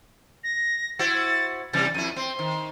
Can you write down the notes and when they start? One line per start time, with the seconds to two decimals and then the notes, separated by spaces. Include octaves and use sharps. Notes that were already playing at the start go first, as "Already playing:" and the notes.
0.44 A#6
0.99 E4 F#4 C5 A6
1.73 C3 E3 G3 A6
1.94 F2 E4 D#7
2.16 C4 C6
2.39 D#3